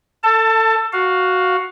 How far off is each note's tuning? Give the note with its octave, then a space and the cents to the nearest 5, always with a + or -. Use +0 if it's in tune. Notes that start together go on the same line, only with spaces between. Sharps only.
A4 +25 A5 +5
F#4 +0 F5 +10